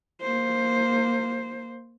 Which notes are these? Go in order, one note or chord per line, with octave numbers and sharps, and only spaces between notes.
A#3 C5